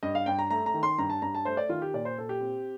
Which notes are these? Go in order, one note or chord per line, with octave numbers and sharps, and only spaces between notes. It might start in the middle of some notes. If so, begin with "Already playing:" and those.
G2 D#5
F5
G2 G5
A#5
A3 A#5
A#5
D#3
C6
G2 A#5
A5
G2 A#5
A5
A3 C5
D5
D#3 F4
G4
A#2 D5
C5
A#2 A4
G4
C4